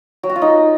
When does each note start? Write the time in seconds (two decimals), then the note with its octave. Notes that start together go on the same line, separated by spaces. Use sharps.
0.23 F#3
0.30 F#4
0.36 F4
0.42 D#4